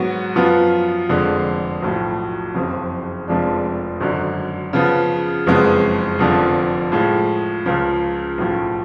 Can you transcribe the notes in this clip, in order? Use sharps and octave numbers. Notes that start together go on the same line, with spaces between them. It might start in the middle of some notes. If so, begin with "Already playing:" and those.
Already playing: G#2 F#3 B3 F#4
F#2 F3 B3 F4
F1 F2 D3 G#3
B1 A2 F3
F#1 F2 C#3
F1 F2 F3 G#3 D4
G#1 F#2 D3
C#3 F3 B3
F#1 F2 C#3 G#3 B3
F1 F2 D3 F3
A2 F3 G#3
C#2 C#3 F3
B1 A2 F3